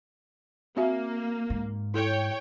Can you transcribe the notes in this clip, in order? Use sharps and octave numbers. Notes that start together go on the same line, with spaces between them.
A#3 C4 F#4 E5
G#2
E4 A4 C#5 G5